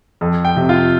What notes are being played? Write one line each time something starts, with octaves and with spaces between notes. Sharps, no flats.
F2
G5
C3
F4